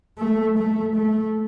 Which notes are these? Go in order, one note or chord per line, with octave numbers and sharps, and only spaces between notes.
A3
A3
A3